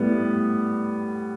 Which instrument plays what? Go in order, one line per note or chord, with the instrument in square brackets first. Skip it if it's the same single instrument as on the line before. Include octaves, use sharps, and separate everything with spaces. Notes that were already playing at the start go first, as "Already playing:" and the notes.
Already playing: [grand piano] A2 G3 B3